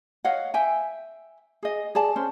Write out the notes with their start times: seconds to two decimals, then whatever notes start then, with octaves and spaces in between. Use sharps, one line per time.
0.24 C#5 D#5 F5 F#5
0.54 E5 G5 G#5
1.63 G#4 D#5
1.95 G#4 D5 A5
2.16 C#4 C5